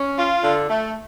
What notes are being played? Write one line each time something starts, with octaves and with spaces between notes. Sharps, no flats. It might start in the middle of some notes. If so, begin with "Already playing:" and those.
Already playing: C#4
F4
D3
A3